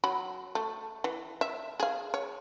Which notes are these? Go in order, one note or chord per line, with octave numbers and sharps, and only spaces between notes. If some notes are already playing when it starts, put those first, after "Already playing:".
F#3 B5
A3
E3
E5
G#4 F5
C#5